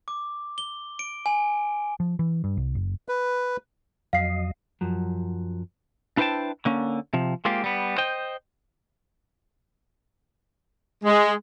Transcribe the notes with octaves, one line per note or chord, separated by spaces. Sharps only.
D6
G7
D7
G#5
F3
E3
G2
C2
F#1
B4
F2 F#3 D#5 F5 C7
F#2 F3 F#3
D4 E4 B4 C5 G5 A5
D3 A#3 C#4
C3 F3
G#3 A#3 C4 F4 G4
G3 B3
C5 D#5 G5
G#3